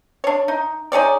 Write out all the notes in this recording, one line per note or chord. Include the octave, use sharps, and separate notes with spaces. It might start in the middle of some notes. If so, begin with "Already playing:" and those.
D4 C#5
D#4
D#4 G#4 C#5 D5